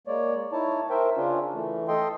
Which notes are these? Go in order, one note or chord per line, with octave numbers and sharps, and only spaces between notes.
G#3 A#3 C#5 D5
D#4 E4 C#5 A5
A#4 C5 E5 G5
C#3 C#4 D4 F4
E3 A3
A4 D#5 G5 C6